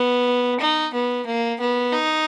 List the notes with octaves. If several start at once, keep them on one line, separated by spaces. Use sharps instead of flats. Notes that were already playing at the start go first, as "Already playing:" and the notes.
Already playing: B3
D#4
B3
A#3
B3
D#4